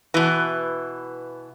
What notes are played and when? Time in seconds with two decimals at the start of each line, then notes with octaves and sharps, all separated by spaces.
0.14 B2 E3